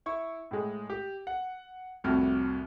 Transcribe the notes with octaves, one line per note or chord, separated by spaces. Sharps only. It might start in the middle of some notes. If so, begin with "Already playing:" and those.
E4 C#6
A2 G#3
G4
F#5
C2 F2 A2 F#4 F6